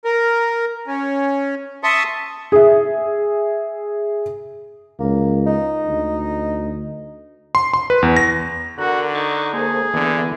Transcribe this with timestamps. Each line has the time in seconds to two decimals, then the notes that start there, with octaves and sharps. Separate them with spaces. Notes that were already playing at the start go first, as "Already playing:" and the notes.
0.05 A#4
0.87 C#4
1.84 E5 A5 C6 C#6 D#6
2.52 G#4 E5
5.00 C#2 A#3
5.46 D#4
5.86 D2
7.55 C6
7.73 C6
7.90 B4
8.03 E2
8.16 A#6
8.79 D3 F#4 A#4 F#5
9.15 D#4 C#6 G#6 A6
9.53 A#3 G#4 A4 C5
9.94 D3 E3 B3